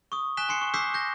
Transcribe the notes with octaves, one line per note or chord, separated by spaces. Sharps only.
C#6 D#6
G#5 F#6 B6 E7 G7
G#5 C6 C7 C#7
C#6
D6 E6 G6 B6 C7
C#6 G6 A#6